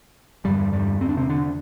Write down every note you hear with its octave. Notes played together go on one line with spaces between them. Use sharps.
E2 G2 D3 G3
G2 G3
C4
D4
C3 C4
D3 D4